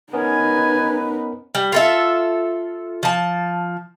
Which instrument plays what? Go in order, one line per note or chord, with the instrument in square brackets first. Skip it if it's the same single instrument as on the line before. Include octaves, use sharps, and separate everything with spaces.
[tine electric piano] B3 C#4 A#4 [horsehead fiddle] D#4 B4 [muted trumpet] G#5
[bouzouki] G3
F4 A4 E5
F3 A5